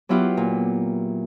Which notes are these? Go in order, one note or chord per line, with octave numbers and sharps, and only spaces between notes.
F#3 B3 E4 F4 G4
A#2